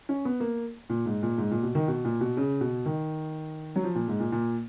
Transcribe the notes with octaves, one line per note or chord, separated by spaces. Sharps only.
C#4
B3
A#3
A#2
G#2
A#2
G#2
A#2
B2
D#3
B2
A#2
B2
C#3
B2
D#3
F#3
F3
A#2
G#2
A#2
A#2